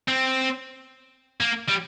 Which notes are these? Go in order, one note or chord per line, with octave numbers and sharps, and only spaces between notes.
C4
A#3
G3